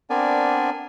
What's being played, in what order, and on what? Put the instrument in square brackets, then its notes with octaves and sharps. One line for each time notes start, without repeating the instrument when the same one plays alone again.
[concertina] B3 C4 D4 A#4 D5 G#5